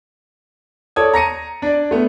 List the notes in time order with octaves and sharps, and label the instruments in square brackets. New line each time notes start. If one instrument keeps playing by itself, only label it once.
[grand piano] A4 C#5 D5 A5 D#6 G#6
A#5 A#6 C#7 D#7
D4 D5
A3 B3